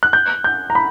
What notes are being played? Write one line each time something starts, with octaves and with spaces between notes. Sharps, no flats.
F#6
G6
G6
A#5
B5